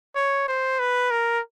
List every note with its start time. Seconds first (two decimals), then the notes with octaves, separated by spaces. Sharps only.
0.16 C#5
0.48 C5
0.79 B4
1.11 A#4